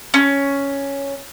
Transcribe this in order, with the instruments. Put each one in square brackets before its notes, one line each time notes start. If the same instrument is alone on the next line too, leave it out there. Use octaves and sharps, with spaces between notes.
[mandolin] C#4